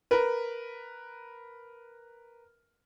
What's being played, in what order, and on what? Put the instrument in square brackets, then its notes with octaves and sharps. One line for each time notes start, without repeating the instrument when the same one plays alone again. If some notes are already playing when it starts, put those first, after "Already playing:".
[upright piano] A#4 B4